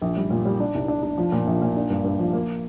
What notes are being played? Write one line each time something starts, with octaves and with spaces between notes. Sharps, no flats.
A#1
G3
A#2
G3
D4
C2
D4
D4
F3
A#2
A#1
A#2
D4
G2
G2
F3
A#3